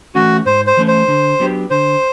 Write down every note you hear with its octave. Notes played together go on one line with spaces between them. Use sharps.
E3 A3 C#4 F#4
G#2 C5
C5
E3 A3 C#4
C5
D3
F#3 B3 D4 G4
D3 C5